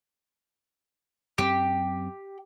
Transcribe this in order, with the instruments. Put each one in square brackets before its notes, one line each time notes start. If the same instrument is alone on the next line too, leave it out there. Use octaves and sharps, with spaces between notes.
[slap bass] F#2 B3 C4 [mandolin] G4